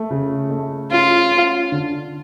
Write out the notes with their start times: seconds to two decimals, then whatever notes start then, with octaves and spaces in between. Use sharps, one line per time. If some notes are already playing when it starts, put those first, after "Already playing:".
Already playing: A3
0.10 C#3
0.51 A3
0.91 C#4 F4
1.31 C#4
1.72 D3